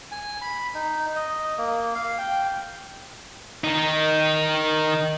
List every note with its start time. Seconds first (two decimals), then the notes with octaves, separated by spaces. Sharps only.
0.11 G#5
0.41 B5
0.74 D#4
1.16 D#5
1.58 A#3
1.95 F5
2.19 G5
3.64 D#3 D#4